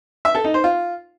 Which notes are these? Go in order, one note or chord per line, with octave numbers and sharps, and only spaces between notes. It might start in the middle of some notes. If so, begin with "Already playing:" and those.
E5
A4
D#4
C5
F4